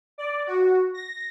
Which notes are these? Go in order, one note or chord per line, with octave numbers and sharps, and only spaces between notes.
D5
F#4
A#6